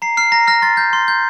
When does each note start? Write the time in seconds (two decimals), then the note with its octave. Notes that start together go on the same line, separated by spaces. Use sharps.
0.02 A#5 C7
0.17 F6 C7
0.32 A#5 A#6
0.48 F6 A#6
0.62 C6 A6
0.77 G6
0.93 C6
1.08 G6